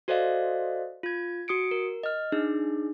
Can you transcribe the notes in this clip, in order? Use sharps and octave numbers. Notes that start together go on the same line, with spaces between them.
F#4 A4 C5 D5 D#5 F5
F4 G#6
F#4 D#6 C#7 D7
A#4
D#5 F6
D4 D#4 G#4